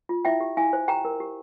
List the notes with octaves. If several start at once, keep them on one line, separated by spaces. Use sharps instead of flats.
F4
E4 E5 G5
G4
E4 F5 G#5
C5
G4 G5 A#5
A#4
G4